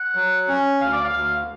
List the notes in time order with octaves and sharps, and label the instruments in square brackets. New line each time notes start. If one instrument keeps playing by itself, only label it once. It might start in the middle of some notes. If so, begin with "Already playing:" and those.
Already playing: [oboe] F#5
[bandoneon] F#3
C#4
[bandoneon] D2 [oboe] F5
[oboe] D5
F5
[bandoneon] D2